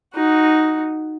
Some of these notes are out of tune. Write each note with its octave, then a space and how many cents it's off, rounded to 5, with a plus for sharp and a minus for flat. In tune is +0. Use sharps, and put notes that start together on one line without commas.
D#4 +0 F#4 +0